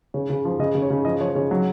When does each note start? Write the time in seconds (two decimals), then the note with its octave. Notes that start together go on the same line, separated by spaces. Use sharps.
0.14 C#3 C#5
0.30 C#3
0.45 F3
0.59 C#3 D#5
0.75 C#3
0.82 C#5
0.90 C#3
1.05 F3 D#5
1.20 F3 C#5
1.35 C#3 C#5
1.50 F#3 C#5